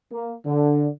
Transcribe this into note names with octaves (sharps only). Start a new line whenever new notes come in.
A#3
D3